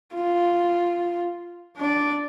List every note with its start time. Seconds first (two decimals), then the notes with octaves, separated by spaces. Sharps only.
0.14 F4
1.77 D4 D5